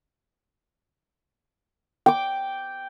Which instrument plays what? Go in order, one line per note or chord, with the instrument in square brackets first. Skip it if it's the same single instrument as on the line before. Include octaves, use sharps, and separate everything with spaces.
[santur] G5 D6